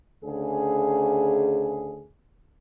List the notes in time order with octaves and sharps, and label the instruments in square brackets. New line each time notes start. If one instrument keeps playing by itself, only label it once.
[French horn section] D2 C#3 G#4